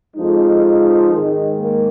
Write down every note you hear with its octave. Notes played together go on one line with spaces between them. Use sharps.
F2 F3 G#3 D#4
G#2 D#3 G#3
A#3